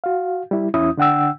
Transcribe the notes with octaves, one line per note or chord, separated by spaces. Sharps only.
F#4 F5
G3 E4
E2 E3 C#4 E4 D#6
D3 D4 F#5 G5 E6